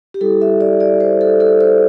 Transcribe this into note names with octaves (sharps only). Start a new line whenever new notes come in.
G4
G3 E4 A4
E5
D5
D5
C5
A4
A4
C5